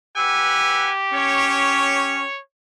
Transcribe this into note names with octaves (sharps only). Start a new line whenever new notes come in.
G4 B4 F#5 G#5 E6
C#4 C#5